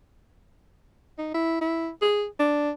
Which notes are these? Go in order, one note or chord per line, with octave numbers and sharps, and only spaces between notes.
D#4
E4
E4
G#4
D4